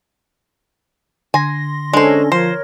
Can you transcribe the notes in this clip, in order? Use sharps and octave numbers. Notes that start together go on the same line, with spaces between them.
D3 G#5 C6 A#6
G#3 C#4 D4 A4 C5
F3 A#4 C5 C#5